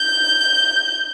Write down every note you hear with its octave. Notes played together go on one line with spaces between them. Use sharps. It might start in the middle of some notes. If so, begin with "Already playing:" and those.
Already playing: G6